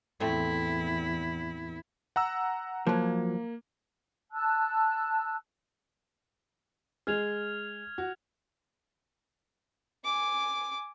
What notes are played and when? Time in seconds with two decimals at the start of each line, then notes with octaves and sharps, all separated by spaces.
0.20 E2 A2 A3 C4 E4
2.16 F#5 A#5 E6
2.87 F3 F#3 A#3
4.32 A5 E6 F#6
7.07 G#3 G#4 F6 G#6 F7
7.98 F#4
10.04 G#5 D6